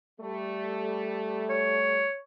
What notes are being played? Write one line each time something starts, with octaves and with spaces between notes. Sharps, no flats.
G3 A3
C#5